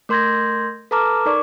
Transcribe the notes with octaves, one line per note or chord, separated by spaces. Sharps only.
A3 A#4 C6 G6 G#6 A#6
A4 B4 A5 A#5 D6 F6
D#4 A#4 D5 C#6 D6